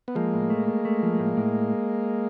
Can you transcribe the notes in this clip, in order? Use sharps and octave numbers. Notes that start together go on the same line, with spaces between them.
B3
F3 G#3 A#3
A2
A3
A3
A3
F3
A2
A2